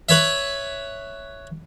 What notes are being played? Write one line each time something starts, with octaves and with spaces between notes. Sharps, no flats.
B4 C#5 E5